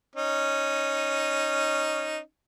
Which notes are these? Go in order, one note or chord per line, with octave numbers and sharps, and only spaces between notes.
C#4 D#4